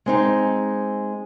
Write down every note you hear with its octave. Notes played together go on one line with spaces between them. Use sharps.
G#3 C4 D#4